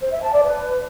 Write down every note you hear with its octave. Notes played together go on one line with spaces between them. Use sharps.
C5
E5
A5
D5
B4